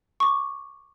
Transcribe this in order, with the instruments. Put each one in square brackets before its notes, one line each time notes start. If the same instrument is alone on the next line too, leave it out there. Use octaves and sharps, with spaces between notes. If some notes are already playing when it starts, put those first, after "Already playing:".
[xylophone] C#6 D6